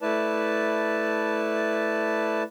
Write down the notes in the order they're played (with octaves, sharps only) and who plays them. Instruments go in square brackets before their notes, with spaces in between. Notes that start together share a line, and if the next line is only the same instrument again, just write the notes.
[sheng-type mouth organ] A3 E4 B4 D5 A5